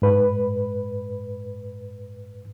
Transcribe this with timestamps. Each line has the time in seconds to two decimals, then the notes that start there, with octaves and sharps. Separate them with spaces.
0.02 G#2 B4